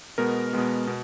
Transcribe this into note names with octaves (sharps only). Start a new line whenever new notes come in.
B2 G#3 B3 A#4
B2 G#3 B3
B2